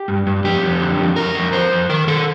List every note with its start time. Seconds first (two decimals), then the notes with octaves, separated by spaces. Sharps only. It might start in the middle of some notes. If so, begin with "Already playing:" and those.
Already playing: G4
0.08 G2
0.27 G2
0.44 F2 G4
0.63 F2
0.80 D3
0.99 F2
1.16 F2 A#4
1.35 F2
1.53 F2 C5
1.72 F2
1.89 D#3 A#4
2.07 D#3 A4